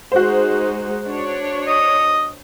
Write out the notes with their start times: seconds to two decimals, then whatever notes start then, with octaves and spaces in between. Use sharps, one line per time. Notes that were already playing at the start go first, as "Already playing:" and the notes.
0.12 G#3 D#4 F#4 C5
1.07 D4 C#5
1.67 D#5